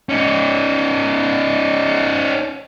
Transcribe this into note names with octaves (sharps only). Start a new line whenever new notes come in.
C#4 D#4